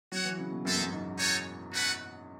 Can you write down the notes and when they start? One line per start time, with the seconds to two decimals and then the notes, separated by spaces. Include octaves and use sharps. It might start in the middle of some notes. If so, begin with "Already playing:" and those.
0.12 F#3 F#4 C#5 F#5
0.25 E3
0.38 C#3
0.51 B2
0.65 F#2 G#3 D#4 A4 E5
0.76 E2
0.83 F#2
0.92 G#2
1.18 D#4 F#4 A4 C#5
1.72 A3 C#4 F#4 B4 F#5